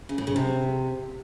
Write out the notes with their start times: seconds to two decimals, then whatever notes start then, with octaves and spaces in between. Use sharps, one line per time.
0.09 C#3
0.18 A2
0.27 C#3
0.36 C3